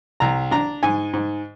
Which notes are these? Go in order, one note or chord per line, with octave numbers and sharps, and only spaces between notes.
C2 A#5
D4 A#5
G#2 G#5
G#2